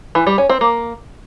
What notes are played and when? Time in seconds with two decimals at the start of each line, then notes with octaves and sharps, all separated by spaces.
0.15 E3
0.27 G3
0.38 C#4
0.50 C4
0.61 A#3